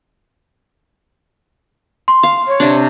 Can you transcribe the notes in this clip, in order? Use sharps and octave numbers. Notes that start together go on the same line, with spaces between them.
C6
F5
C#5
C3 D4